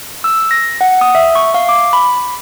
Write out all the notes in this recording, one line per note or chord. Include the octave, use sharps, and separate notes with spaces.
E6
A#6
F#5
D#6
E5
C#6
F5
D6
B5